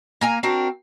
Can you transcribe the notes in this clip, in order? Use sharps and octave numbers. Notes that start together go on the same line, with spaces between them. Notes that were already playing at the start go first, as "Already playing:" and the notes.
A#3 G#5 A#5
C4 D4 F#4 A#4